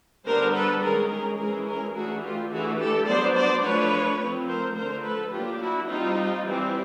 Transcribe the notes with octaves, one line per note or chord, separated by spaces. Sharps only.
D3 G3 B3 D4 A#4 C5
A4 B4
D#3 G#3 C#4 G#4 A#4
G#4 A#4
E3 G#3 C#4 G#4 A#4
G#4 A#4
E3 A3 D4 F#4 G#4
F4 G4
E3 A3 D4 F#4 G#4
G4 A4
F#3 B3 D4 C5 D5
C5 D5
F3 A3 D4 B4 C#5
F3 A3 C4
A#4 C5
D3 F3 A3 A#4 C5
A4 B4
F#3 A#3 D4 F4 G4
E4 F#4
G3 C4 D#4 F4
E3 G3 C4